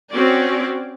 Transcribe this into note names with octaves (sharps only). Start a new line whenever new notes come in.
C4 C#4 F#4 D5